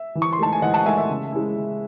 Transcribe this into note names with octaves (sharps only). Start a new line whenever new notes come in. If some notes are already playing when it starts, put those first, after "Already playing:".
Already playing: E5
E3
C#6
C6
A3 D#4 A5
G#5
E3 D#5 F#5
F#5 A5
A3 D#4 E5 G#5
E5
C#3
G#3 C#4 E4
C#3